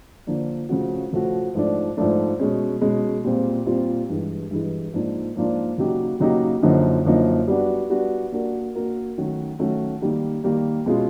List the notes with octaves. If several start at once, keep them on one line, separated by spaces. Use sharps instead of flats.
D3 F3 A#3 D4
C#3 F3 A3 C#4 F#4
C#3 F3 A3 C#4 F#4
G#2 F3 A3 D4
G#2 F3 A3 D4
B2 G#3 C#4
B2 G#3 C#4
A#2 G3 C4 F4
A#2 G3 C4 F4
G2 E3 G#3
G2 E3 G#3
G#2 F3 A#3 D4 F4
G#2 F3 A#3 D4 F4
C#3 F#3 A#3 D#4 G4
C#3 F#3 A#3 D#4 G4
F#2 D3 F3 A#3 D#4
F#2 D3 F3 A#3 D#4
G3 B3 D4 F#4
G3 B3 D4 F#4
A#3 D4 F#4 A#4
A#3 D4 F#4 A#4
D#3 F#3 A3 C#4 F#4
D#3 F#3 A3 C#4 F#4
D#3 G3 A#3
D#3 G3 A#3
B2 G#3 C#4 F4